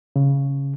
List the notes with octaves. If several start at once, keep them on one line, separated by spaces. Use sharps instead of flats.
C#3